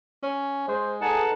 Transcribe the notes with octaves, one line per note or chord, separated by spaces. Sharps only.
C#4
G#3 C5
D#4 G#4 A4 B4 F#5 A5